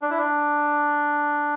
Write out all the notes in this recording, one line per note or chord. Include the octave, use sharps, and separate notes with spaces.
D4
E4
D4